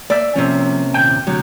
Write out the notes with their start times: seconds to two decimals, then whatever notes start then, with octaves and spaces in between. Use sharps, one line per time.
0.10 A#3 D5 E5
0.36 C3 F3 A#3 C#4
0.94 D#2 A#2 G5
1.27 D2 C3 F#3